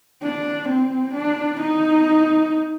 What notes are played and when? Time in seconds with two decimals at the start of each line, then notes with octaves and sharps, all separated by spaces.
0.23 D4
0.68 C4
1.14 D4
1.60 D#4